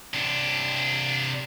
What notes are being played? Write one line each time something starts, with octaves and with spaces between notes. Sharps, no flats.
C3 D4